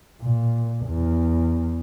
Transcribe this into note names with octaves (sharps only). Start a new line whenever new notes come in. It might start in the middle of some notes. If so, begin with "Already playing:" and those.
A#2
E2